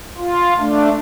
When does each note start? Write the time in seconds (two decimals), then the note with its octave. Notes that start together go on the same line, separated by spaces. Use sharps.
0.18 F4
0.59 A3 D4